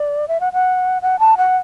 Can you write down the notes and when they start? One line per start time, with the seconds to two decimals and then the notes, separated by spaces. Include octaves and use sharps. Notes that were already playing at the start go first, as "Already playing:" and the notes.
Already playing: D5
0.28 E5
0.40 F#5
0.53 F#5
1.02 F#5
1.19 A5
1.37 F#5